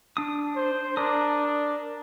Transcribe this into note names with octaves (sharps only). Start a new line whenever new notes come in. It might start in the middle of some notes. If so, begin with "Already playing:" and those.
D4 D#6
C5
D4 A#4 D#6